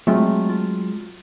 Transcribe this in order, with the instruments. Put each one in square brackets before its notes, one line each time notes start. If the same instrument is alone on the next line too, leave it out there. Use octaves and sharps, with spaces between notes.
[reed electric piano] F#3 G#3 [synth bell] A3 C4 F4
[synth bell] F4